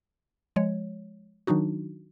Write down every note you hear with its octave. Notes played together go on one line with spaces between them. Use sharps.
F3 G#3 C#5
D#3 F#3 D4 D#4 F#4